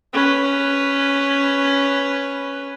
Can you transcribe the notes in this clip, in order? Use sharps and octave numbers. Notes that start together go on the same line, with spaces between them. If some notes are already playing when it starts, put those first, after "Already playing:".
C#4 B4